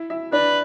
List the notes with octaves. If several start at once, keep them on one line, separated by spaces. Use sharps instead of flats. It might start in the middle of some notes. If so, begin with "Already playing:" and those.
Already playing: E4 E5
E4 E5
D4 B4 D5